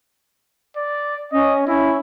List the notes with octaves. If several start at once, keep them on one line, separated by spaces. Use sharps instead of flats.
D5
C#4 D#5
C#4 E4